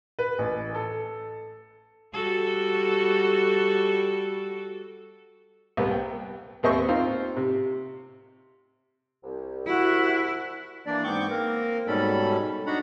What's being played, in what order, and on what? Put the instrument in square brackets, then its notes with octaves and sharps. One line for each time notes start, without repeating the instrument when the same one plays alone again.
[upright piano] B4
A1
A4
[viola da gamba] G3 F#4 A4
[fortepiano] C2 B3
G5
D#2 B3 C4 D#5 E5 C#6
C4 D#4 F4
C3
[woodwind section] C2
[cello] E4 [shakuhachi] F#4
[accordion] E3 A#3 D4 D5
G#2 B3 C4 C#6 D6 G6
A#3 C4 A#4
G#2 B2 G3 C#4 A4 B5
D4 D#4 F#4 F#5 A#5 B5